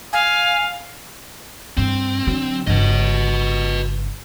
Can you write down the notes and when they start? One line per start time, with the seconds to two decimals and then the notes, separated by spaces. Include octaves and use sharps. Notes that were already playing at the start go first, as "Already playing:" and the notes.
0.13 F5 G#5
1.77 G2 C4
2.27 D3 F#3
2.67 G1 C#3 B4 D#5